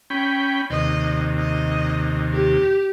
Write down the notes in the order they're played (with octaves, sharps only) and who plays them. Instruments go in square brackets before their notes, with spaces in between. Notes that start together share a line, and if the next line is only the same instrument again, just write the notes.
[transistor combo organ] C#4 G5 B5
[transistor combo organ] D#2 C3 [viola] D#5
[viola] D#5
G4